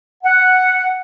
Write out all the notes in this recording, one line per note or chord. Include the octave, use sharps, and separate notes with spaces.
F#5